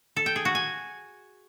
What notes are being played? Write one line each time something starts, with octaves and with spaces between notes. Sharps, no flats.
A4
G5
G#4
F#4
G#5